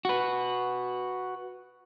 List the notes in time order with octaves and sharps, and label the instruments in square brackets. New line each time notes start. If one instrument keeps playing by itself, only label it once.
[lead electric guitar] F#4 B4